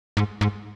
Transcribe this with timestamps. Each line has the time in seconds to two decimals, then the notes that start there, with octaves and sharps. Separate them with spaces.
0.17 G#2
0.41 G#2